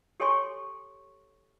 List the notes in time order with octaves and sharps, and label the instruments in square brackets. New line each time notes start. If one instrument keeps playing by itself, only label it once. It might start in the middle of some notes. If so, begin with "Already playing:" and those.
[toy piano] G4 A4 C#5 G#5 C6 C#6